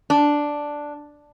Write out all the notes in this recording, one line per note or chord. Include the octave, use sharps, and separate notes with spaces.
D4